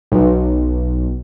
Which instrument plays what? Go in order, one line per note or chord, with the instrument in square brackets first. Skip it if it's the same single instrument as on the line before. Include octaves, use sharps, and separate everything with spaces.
[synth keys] B1